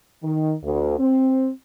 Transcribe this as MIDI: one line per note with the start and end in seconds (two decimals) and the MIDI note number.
0.23 0.54 51
0.63 0.96 38
0.99 1.49 60